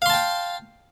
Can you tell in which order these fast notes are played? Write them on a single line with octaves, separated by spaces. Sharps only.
F5 C6 A5 G5